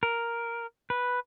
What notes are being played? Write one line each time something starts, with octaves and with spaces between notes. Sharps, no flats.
A#4
B4